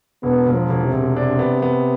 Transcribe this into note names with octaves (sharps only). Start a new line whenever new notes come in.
E1 B3
E1
F3
E1
C3
E1
C3 D4
B3
B3